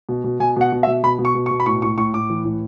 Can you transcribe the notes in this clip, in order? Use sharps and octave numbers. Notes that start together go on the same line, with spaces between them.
B2
B2
B2 G#5
B2 F#5
B2
E5
B2
B2 B5
B2
C#6
B2
C#6
B2
B5
A2 C#6
A2 C#6
A2 C#6
A2 D6
E3
A2